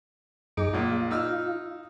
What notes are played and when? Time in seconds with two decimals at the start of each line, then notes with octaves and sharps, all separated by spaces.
0.57 F#2 D#4 G#4 D6
0.73 A#1 A#2 F4
1.11 D#4 E6 F6